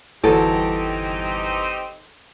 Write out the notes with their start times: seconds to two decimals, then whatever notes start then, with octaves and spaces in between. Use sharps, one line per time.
0.24 G1 E2 C4 D#4 F#4 G4 A4 A6